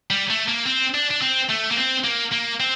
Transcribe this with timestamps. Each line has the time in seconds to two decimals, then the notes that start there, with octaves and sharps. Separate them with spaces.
0.11 G3
0.30 A3
0.48 A#3
0.66 C4
0.94 D4
1.10 D4
1.21 C4
1.49 A3
1.71 A#3
1.77 C4
2.04 A#3
2.32 A#3
2.60 C4